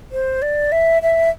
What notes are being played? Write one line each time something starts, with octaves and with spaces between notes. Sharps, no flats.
C5
D5
E5
E5